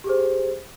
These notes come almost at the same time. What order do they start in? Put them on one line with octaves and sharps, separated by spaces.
G4 G#4 C5